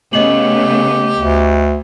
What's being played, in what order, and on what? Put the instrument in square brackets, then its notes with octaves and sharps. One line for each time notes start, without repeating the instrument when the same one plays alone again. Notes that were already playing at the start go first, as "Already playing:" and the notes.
[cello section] C#3 A3 B3 [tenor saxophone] G4 [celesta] D#5 F#7
[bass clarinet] D2